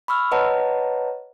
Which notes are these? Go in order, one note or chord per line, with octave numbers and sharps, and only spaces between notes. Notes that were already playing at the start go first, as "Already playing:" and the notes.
B5 C#6 E6 F6
B4 C#5 D#5 F#5 A5 A#5